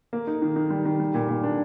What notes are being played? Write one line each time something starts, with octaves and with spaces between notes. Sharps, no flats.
A#3
D#4
D#3
D#3
G3
D#3
G3
A#2
A#2
D4